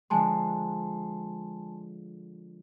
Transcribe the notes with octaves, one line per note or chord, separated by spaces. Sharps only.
D3 F3 G#3 G#5 A5 C6